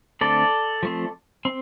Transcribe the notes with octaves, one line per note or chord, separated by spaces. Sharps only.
D3 A3 C4 A4 D5
F3 A3 C4
C4